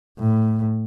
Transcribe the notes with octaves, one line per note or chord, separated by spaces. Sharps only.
A2